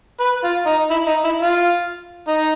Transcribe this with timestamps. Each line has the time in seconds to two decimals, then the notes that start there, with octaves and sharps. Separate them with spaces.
0.20 B4
0.44 F4
0.66 D#4
0.90 E4
1.07 D#4
1.24 E4
1.42 F4
2.28 D#4